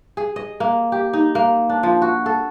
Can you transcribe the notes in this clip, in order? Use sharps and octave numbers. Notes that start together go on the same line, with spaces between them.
G#4
D#5
A#3
G4
D#4
A#3
D4
F3
F#4
A4